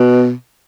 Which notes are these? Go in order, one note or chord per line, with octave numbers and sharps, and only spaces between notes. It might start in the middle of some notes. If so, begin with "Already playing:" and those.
Already playing: B2